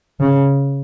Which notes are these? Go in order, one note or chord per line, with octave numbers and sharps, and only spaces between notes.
C#3